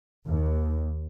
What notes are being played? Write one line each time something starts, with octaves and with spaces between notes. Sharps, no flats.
D#2